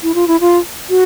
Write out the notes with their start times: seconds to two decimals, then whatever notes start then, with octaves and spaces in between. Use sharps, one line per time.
0.03 E4
0.15 F4
0.28 E4
0.41 F4
0.90 F#4